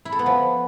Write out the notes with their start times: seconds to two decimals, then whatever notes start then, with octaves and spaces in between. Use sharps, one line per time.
0.05 E4
0.12 A4
0.19 B3
0.26 F3